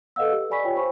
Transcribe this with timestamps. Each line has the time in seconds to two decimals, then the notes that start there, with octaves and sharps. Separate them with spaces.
0.16 A4 B4 D#5 F5 F#5 E6
0.32 G4
0.50 G4 D5 G#5 B5 C#6 B6
0.64 F4 C#5 G5
0.76 C5 G#5 B5 C#6